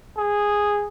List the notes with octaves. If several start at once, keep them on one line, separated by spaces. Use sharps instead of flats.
G#4